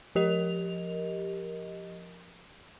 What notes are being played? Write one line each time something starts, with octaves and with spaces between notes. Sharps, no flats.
F3 G4 A#4 D#5 F7